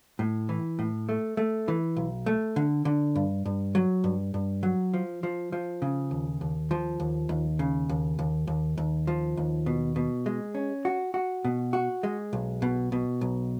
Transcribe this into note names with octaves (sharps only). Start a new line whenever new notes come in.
A2
E3
A2
A3
A3
E3
B1
A3
D3
D3
G2
G2
F#3
G2
G2
F#3
F3
F3
F3
C#3
D#2
D#2
F3
D#2
D#2
C#3
D#2
D#2
D#2
D#2
F3
D#2
B2
B2
G#3
C#4
F#4
F#4
B2
F#4
G#3
B1
B2
B2
B1